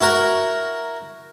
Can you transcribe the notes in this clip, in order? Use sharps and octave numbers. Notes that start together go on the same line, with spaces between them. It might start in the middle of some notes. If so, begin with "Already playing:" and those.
E4 F#4 A#4